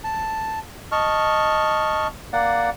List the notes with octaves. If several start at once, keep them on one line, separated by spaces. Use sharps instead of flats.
A5
D#5 A5 C#6 F6
A#3 D5 F#5